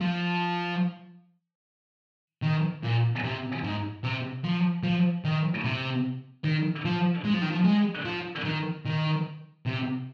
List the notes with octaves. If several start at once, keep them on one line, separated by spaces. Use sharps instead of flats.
F3
D#3
A#2
C3
G#2
C3
F3
F3
D#3
C3
D#3
F3
G#3
F3
D#3
F3
G#3
F3
D#3
D#3
C3